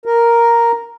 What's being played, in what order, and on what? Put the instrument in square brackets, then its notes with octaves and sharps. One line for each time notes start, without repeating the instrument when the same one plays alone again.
[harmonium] A#4